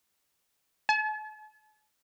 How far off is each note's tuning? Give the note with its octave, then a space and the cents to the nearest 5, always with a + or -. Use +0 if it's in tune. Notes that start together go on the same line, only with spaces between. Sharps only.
A5 -45